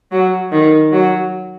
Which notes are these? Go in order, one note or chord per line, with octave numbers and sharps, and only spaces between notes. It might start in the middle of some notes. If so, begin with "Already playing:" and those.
F#3
D#3
F#3